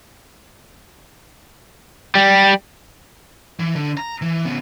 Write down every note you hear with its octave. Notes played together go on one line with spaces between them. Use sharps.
G3
E3
D3
A#5
E3
C#3 B3